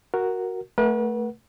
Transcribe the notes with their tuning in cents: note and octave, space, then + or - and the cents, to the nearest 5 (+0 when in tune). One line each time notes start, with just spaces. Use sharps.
F#4 +0 A#4 +0
A3 +0 B4 -40 F#5 +0